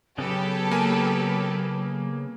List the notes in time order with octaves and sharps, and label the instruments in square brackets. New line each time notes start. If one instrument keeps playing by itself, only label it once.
[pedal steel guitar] C#3 B3 C#4 [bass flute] F#3 [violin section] G4 A4 B4
[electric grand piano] A#3 G#5